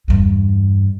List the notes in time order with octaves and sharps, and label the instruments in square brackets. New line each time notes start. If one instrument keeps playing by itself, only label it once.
[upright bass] E2 G2